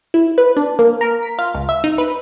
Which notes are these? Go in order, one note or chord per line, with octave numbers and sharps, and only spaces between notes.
E4
B4
D4
A#3
A#4
B6
F4
C#2
E5
D#4
B4